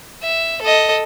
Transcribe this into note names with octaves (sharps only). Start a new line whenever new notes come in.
E5
A4 D#5